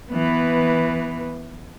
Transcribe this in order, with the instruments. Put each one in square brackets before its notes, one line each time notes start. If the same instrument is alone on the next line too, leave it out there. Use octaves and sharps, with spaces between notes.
[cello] E3 B3